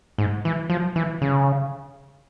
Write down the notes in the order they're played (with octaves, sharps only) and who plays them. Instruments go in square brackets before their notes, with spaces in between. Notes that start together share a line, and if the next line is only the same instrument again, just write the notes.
[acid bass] G#2
E3
F3
E3
C#3